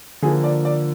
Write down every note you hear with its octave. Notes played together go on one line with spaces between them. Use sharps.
D3 F3 A#3 G#4
D5
D5